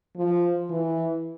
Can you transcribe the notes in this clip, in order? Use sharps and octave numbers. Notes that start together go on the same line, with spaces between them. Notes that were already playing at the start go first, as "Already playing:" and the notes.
F3
E3